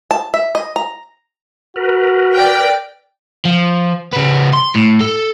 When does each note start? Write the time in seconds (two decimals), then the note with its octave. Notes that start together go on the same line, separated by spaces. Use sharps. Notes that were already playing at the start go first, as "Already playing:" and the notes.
0.11 A5
0.34 E5
0.55 D#5
0.76 A#5
1.76 F#4 A#4 B4
2.34 D5 G5
3.45 F3
4.13 C#3 B3
4.54 C6
4.75 A2
5.01 A4